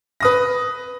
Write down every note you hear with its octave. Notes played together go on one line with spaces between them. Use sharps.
B4 D#6 A#6